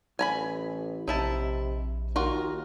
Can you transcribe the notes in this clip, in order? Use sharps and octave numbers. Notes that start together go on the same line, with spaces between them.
A1 G#5 A#5 B5
A#1 C3 D#4 E4 A5
D#2 F4 F#4 A#4